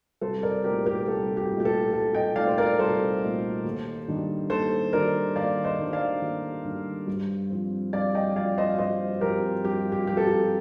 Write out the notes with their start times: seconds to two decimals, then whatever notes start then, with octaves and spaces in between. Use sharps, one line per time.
0.21 C2 A4 C5
0.43 A#4 D5
0.64 A#2 A3 D#4 G4 A#4
0.86 G4 A#4
1.07 C2 A4
1.37 G4
1.51 A#2 A3 D#4
1.60 G4
1.65 A4
1.93 C2 A4
2.15 D#5 G5
2.36 A#2 A3 D#4 D5 F5
2.47 C5
2.58 A#4 D5
2.79 C2 A4 C5
3.22 A#2 A3 D#4
3.64 D#2
4.08 D#3 G3 D4
4.50 D#2 A4 C5
4.93 D#3 G3 D4 A#4 D5
5.36 D#2 D5 F5
5.64 C5 D#5
5.79 D#3 G3 D4
5.93 D5 F5
6.22 D#2
6.65 D#3 G3 D4
7.07 G2
7.50 F3 C4
7.93 G2 D5 F5
8.15 D#5 G5
8.36 F3 C4 D5 F5
8.58 C5 D#5
8.69 F5
8.78 G2 C5 D#5
9.21 F3 C4 G4 A#4
9.64 G2 G4
9.92 G4
10.07 F3 C4 G4
10.17 A4
10.27 G4